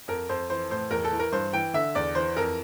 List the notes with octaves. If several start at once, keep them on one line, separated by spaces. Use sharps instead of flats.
F2 A#4
F2 C5
E3 C5
A2 C5
E2 A#4
A4
E3
A#4
G2 C5
E3 G5
D3 E5
E2 D5
E3 C5
F2 A#4